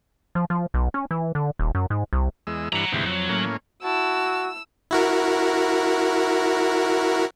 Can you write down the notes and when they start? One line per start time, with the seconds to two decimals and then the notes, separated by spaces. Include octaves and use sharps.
0.35 F3
0.50 F3
0.74 B1
0.94 C#4
1.11 E3
1.35 D3
1.59 D#1
1.75 F#2
1.90 G#2
2.13 C2
2.47 E2 G#3 E6
2.73 G2 E3 F#5 A#5
2.92 D2 G#2 C3 E3
3.06 F2 F#3
3.29 A2 A#3 C#4
3.83 E4 F#4 A5 E6
4.91 E4 F#4 A#4